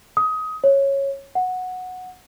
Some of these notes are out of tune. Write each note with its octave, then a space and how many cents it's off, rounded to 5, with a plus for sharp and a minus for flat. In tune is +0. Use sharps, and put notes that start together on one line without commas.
D#6 +20
C#5 -10
F#5 -10